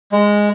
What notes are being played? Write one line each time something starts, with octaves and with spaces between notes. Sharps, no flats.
G#3